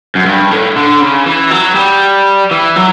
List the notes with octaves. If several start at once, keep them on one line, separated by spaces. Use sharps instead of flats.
F#2
G2
A2
D3
C#3
E3
F#3
G3
E3
F#3